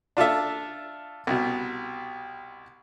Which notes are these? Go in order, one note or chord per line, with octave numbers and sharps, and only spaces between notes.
D4 F4 A4 E5
C2 B2